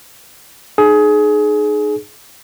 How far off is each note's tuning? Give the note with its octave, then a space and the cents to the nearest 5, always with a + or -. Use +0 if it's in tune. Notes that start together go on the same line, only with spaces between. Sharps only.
D#4 -35 G#4 +25